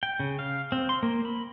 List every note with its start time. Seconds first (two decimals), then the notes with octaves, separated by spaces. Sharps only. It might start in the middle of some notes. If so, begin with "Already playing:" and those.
0.03 G5
0.20 C#3
0.39 F5
0.72 C4
0.89 C6
1.03 A#3
1.25 B5